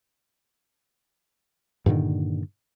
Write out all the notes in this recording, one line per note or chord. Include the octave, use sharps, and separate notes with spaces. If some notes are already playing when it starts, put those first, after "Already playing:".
G2 A#2 D3 D#3